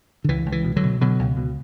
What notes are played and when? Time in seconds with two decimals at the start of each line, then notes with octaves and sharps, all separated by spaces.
0.24 D3
0.29 C#2 E3
0.46 C#2
0.52 E3
0.64 B2
0.76 D3 F#3
0.83 B2
1.01 B2 D3 F#3
1.19 C#2
1.37 B2